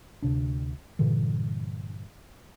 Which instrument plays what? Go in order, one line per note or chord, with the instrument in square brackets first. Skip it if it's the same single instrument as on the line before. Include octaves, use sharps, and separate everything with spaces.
[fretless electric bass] D2 C3 D4
G2 A#2 D3 E3